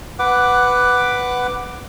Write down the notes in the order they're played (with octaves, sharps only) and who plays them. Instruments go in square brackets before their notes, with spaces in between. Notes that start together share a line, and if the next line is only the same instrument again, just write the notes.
[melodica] B4 F#5 D6